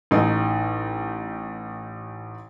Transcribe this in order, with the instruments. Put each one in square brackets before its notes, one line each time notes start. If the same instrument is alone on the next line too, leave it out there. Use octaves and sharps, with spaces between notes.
[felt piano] A1 D#4